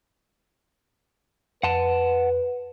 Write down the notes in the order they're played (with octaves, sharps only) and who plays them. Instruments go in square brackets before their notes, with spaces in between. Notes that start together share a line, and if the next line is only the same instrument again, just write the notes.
[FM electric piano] F2 [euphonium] B4 [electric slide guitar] F#5 A5